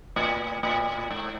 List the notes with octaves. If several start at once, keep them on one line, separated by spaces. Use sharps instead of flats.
A2
A2
G#2